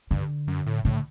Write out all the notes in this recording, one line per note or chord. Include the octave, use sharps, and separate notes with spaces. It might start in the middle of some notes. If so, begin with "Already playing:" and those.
G2 D3
F#2
A2
A2 D3